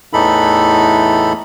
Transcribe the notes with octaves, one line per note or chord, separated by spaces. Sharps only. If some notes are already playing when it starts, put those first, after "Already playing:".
E2 A2 E3 D#4 A4 B5